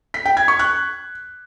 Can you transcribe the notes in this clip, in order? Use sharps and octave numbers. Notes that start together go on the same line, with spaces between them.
B6
G5
G#6
C#6
F#6